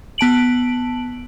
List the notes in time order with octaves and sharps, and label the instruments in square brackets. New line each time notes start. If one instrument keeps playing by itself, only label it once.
[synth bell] B3 A5 D7 F#7